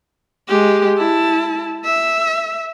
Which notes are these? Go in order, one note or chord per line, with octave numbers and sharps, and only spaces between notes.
G#3 G4
E4 A5
E5